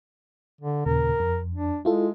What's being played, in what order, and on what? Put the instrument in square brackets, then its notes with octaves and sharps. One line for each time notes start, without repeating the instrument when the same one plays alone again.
[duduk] D3
[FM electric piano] D#2 A#2 C#3 [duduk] A#4
[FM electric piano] F2
[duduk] D4
[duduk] G#3 [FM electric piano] E4 F4 A4